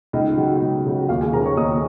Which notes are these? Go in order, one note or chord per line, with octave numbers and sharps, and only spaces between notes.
C#2 D#4 D#5
C#3 F#3
C#2
C#3 F#3
D#2 F4 F5
G#4 G#5
C#3 F3 A#4 A#5
C#5 C#6
D#2 D#5 D#6